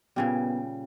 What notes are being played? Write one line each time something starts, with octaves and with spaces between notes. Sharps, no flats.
A#2 C#3 G3 B3